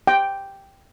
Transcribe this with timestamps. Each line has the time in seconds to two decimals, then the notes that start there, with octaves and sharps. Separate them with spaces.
0.07 G5